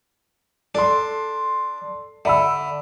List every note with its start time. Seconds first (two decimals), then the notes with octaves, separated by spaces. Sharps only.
0.75 D4 A4 C6
2.25 D3 E5 B5 E6